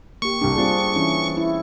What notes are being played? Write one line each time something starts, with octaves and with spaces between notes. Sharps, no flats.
A#3 G4 C#6
C2 G3 D4
G3 C4 D4 F4 G#4
E3 C#4 E4
E4